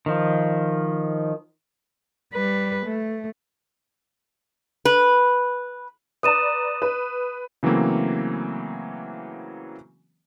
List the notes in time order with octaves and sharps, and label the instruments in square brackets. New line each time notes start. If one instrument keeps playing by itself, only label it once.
[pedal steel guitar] D#3 F3
[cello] G3 B4
A3
[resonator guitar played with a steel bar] B4
[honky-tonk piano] B4 D5 A#5 [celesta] D#6 D#7 E7
[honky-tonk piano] B4
[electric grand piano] C#3 E3 F#3 A3 A#3 C4